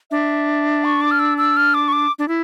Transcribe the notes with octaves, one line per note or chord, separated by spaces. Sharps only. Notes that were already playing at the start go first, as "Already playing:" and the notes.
D4 E5
C#6
D6
F6
E6
E6
F6
D6
C#6
D6
D4
E4